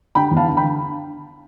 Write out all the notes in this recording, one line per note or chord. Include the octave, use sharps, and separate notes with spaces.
D3 G5 B5
E2
F5 A5
D3
G5 B5
D3